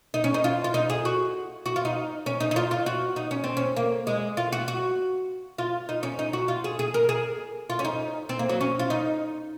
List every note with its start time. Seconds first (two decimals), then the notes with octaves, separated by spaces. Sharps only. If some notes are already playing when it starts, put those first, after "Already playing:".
0.14 D#4
0.24 C#4
0.34 D#4
0.44 F4
0.64 F4
0.74 D#4
0.90 G#4
1.05 F#4
1.66 F#4
1.76 F4
1.85 D#4
2.26 C#4
2.40 D#4
2.51 D#4
2.56 F4
2.71 F4
2.86 F#4
3.16 D#4
3.31 C#4
3.44 C4
3.57 C#4
3.77 A#3
4.07 G#3
4.37 F4
4.52 F#4
4.68 F#4
5.58 F4
5.89 D#4
6.03 C#4
6.19 D#4
6.33 F#4
6.48 F4
6.64 G#4
6.79 G#4
6.94 A#4
7.09 G#4
7.70 F4
7.79 C#4
7.85 D#4
8.29 C4
8.39 A#3
8.49 F#3
8.61 C#4
8.79 F4
8.90 D#4